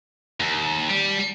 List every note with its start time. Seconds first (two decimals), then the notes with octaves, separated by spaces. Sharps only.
0.40 D#2
0.89 G3